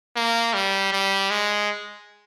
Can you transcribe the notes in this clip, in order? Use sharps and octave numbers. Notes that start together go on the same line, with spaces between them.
A#3
G3
G3
G#3